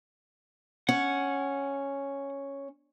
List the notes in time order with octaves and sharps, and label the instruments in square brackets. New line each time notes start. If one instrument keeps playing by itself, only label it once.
[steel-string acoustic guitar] C#4 [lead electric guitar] F#5